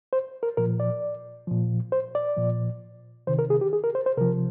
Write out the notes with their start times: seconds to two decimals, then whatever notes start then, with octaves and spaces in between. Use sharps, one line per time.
0.13 C5
0.43 A#4
0.57 A#2 F3 A#4
0.80 D5
1.47 A#2 F3
1.92 C5
2.15 D5
2.37 A#2 F3
3.27 C3 D#3 C5
3.39 A#4
3.50 G#4
3.61 G4
3.73 G#4
3.84 A#4
3.95 C5
4.06 C5
4.17 C3 F3 A#4